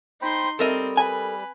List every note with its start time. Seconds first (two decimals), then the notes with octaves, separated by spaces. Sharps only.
0.22 D#4 C5 G5 B5 C6
0.59 G3 C4 A4 A#4 D#5
0.97 B4 G#5